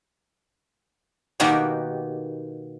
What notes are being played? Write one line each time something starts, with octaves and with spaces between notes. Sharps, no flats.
B2 D#3 A#3 D#4 F#4 G4